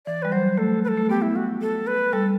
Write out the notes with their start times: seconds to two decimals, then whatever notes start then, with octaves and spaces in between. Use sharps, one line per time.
0.06 E3 D5
0.22 G3 B4
0.32 F#3 C5
0.58 A3 A4
0.84 B4
0.88 A4
0.98 A3
1.09 B3 G4
1.22 E4
1.36 F#4
1.61 A4
1.87 B4
2.13 G3 A4